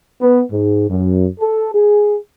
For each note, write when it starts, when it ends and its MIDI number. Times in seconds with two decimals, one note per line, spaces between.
0.22 0.41 59
0.52 0.85 44
0.89 1.25 42
1.40 1.69 69
1.74 2.15 68